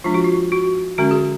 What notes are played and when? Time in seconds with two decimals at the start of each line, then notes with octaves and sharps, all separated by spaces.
0.04 F3 G#3 D4 F4
0.14 F#4
0.24 F4
0.52 F#4
0.98 D3 G#3 C#4 F#4
1.11 G#4